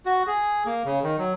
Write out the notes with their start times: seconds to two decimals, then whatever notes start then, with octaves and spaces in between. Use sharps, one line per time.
0.06 F#4
0.27 G#4
0.66 A#3
0.85 C#3
1.03 D#3
1.18 F#3